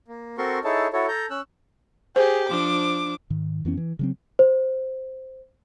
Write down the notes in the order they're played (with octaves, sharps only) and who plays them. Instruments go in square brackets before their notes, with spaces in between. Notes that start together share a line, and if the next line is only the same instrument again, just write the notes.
[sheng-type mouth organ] A#3
C4 F#4 A4 A#4 C6 C#6
D#4 E4 G#4 A4 C#5 A5
E4 F#4 A4 C#5
A4 A#5 G6
C#4 E6 F#6
[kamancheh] G4 G#4 [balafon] C5
[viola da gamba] F3 D4 [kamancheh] D6
[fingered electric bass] G#2 D#3
F2 E3 B3 C#4
E3
C#3 F#3 C4
[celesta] C5